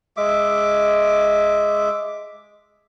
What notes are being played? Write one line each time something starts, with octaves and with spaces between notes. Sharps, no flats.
G#3 E5 D6